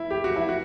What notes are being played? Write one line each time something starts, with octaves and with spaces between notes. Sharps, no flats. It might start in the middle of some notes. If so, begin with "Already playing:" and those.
Already playing: E4
G4
F#4
E4
F#4